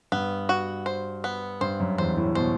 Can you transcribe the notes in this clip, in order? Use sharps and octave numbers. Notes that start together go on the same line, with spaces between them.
G2 B3
F#4
C5
B3
G2 C5
F#2
E2 C5
A2
B2 C5